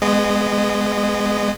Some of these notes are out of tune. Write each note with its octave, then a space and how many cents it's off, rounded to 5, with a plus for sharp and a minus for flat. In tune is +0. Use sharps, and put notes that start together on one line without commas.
G#3 +0 B3 +20 D#5 -30